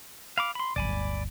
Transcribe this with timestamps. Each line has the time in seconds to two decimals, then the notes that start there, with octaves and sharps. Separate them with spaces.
0.38 F5 B5 D6
0.55 B5 C6
0.76 D1 G1 D5 G#5 B5